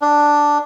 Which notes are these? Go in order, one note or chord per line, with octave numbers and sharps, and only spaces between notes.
D4